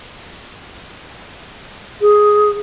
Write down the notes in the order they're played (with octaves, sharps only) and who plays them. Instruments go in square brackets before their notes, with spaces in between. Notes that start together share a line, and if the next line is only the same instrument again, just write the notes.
[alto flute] G#4